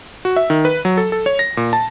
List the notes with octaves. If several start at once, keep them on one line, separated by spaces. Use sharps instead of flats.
F#4
E5
D#3
B4
F#3
A4
A4
C#5
A#6
A#2
A5